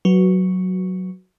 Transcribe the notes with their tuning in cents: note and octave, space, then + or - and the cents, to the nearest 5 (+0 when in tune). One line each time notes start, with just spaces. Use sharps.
F#3 +0 F#4 +0 B4 +0